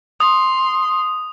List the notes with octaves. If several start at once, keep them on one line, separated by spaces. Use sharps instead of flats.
C6 D#6